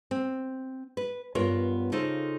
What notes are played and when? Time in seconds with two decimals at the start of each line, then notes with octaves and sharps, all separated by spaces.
0.11 C4
0.97 B4
1.35 G2 B3 F4 A#4 C#5
1.92 C#3 D#4 F4 A4 C5